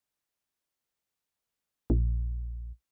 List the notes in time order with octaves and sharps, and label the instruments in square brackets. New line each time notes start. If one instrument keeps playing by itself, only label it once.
[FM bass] A#1